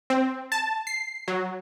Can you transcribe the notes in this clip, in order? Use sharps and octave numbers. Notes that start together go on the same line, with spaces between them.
C4
A5
C7
F#3